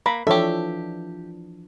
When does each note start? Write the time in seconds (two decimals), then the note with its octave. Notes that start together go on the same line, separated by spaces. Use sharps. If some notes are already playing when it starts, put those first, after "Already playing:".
0.06 A#3 B5
0.27 E3 F3 D4 G4 A4 C#5 E5